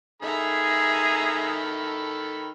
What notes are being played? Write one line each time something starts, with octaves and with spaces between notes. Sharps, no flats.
D#3 G#4 A4 E5 A#5 B5